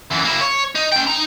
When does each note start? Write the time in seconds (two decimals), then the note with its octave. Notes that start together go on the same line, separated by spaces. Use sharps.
0.11 F#2 E3
0.25 A#3 E4
0.41 C#5
0.76 D#4
0.92 C#4 G5
1.07 D#4 A#5